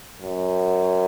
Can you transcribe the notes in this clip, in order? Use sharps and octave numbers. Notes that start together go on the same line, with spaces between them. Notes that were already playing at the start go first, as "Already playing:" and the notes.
F#2